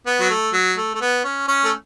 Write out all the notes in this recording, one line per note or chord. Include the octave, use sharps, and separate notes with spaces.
B3
F#3
A3
F#3
A3
A3
B3
C#4
C#4
A3